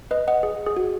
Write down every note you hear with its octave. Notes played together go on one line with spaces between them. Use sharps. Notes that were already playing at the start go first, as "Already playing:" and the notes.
B4 D#5
D#5 F#5
G#4
G#4
F#4